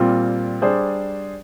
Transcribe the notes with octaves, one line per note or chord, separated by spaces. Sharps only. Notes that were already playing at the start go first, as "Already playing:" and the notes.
Already playing: A#2 G3 C4 F4
G3 D4 G#4 C5